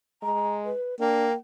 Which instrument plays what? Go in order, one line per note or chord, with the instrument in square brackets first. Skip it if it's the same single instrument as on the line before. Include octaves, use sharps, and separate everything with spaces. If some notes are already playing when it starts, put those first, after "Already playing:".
[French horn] G#3 [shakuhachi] A#5
[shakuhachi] B4
[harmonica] A#3 [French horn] D4 [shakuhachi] G5